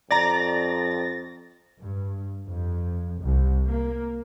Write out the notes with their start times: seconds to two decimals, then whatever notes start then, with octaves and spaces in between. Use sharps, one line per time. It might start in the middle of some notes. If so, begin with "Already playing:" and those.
0.11 F2 D5 A#5 A6 A#6
1.80 G2
2.46 F2
3.20 C2
3.67 A#3